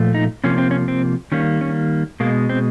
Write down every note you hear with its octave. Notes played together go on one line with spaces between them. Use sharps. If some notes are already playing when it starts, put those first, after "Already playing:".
Already playing: A#2 F3 A3
D#4
C3 F3 A#3 C#4
C4
C#4
C4
D#3 G3 A#3 C#4
C#4
B2 G#3 A#3
C4